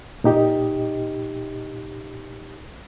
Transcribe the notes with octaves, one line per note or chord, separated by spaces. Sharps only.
A#2 D#4 G4 D#5